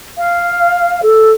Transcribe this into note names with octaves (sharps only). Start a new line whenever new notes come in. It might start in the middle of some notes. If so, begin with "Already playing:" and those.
F5
A4